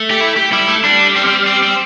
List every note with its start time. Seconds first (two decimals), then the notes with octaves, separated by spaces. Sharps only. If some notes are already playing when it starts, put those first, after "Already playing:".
Already playing: A3
0.11 G4
0.21 E4
0.36 G4
0.52 G3 E4
0.68 A3
0.84 G3 D4
1.16 C4
1.26 C4
1.47 C4
1.63 C4